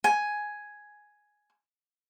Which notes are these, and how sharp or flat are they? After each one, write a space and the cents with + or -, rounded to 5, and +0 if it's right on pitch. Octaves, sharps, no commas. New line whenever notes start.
G#5 +5